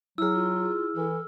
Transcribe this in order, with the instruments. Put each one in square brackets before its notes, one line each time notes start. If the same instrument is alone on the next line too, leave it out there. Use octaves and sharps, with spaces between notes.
[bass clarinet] F#3 [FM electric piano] E4 G#4 [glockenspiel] E6 F6
[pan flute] F4
[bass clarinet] E3 [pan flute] A4